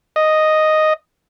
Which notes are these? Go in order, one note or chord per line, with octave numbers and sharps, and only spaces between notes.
D#5